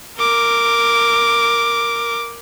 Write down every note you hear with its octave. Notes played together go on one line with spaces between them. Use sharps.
A#4 D6